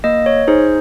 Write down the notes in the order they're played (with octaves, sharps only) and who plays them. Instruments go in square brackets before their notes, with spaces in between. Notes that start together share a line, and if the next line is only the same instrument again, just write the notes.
[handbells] A#3 D#5
C#5
D#4 G#4 C5